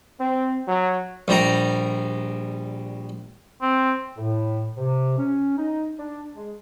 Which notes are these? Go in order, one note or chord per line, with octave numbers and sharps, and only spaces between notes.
C4
F#3
A#1 G3 A#5
C4
A2
C3
C#4
D#4
D4
G#3